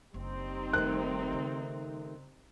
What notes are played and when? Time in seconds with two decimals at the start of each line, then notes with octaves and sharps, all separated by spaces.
0.14 F#1 G3 C4 D#4
0.73 D#3 A3 F#6
1.33 C#3